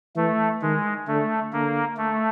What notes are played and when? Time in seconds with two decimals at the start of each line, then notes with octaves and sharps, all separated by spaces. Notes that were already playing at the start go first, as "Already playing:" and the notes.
0.16 E3 A3
0.62 D#3 G#3
1.08 D3 A3
1.53 D3 A#3
1.98 A3